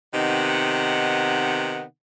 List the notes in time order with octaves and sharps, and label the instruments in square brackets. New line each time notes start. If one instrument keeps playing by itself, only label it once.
[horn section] C3 D#3 B3 D#4 F#5